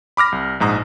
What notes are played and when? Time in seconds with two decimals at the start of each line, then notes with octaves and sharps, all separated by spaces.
0.17 B5 D6 F6 A#6
0.32 C2
0.60 A#1 G#2 A#5 D#6